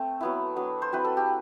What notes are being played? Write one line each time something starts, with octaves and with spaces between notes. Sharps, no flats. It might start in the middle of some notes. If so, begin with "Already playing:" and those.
Already playing: A3 C4
F#3 B3 E4
F#3 B3 D4
C5
F#3 C4 E4 B4
A4
G4